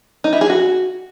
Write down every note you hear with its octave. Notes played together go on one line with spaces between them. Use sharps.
D#4
E4
G#4
F#4